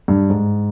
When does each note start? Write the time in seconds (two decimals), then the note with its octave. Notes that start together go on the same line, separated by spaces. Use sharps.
0.08 G2
0.30 G#2